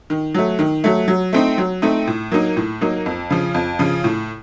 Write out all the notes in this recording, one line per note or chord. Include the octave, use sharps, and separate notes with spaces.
D#3
F#3 A3
D#3
F#3 A3
F#3
A3 C4 D#4
F#3
A3 C4 D#4
A2
F#3 A#3 D#4
A2
F#3 A#3 D#4
F2
C#3 F3
F2
C#3 F3
A2